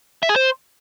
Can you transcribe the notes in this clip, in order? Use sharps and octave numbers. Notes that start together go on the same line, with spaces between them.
E5
G#4
C5